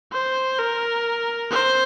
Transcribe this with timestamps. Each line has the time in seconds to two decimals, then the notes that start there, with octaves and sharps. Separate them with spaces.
0.12 C5
0.58 A#4
1.51 C5